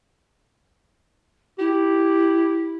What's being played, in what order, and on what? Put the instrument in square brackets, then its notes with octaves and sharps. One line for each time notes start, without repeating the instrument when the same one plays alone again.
[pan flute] E4 [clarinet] G4